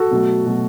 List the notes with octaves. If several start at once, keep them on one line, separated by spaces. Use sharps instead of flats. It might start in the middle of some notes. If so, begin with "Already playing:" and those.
Already playing: F#4 A4
B2 F#3 A3
B2 F#3 A3